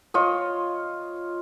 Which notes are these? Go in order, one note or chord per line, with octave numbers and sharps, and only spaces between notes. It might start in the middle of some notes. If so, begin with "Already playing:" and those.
F4 C#5 D#5